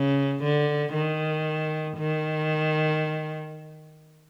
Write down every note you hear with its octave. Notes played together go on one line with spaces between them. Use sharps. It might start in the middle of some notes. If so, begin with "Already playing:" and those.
Already playing: C#3
D3
D#3
D#3